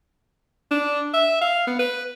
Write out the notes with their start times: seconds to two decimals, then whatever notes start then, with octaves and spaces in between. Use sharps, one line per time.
0.71 D4
1.14 E5
1.41 F5
1.67 B3
1.79 B4